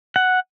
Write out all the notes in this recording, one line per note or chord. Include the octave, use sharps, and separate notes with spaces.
F#5